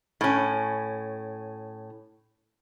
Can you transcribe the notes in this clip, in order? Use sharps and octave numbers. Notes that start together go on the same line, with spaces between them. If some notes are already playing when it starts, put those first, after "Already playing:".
A2 C#4